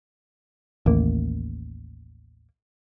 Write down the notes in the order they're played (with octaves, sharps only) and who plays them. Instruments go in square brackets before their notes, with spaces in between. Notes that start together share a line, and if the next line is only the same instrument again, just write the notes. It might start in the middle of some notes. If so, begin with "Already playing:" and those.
[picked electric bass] A1 D#2 A#3